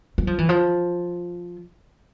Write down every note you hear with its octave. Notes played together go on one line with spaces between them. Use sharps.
G3
F3
E3
F3